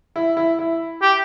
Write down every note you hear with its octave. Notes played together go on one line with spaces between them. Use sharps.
E4
E4
E4
G4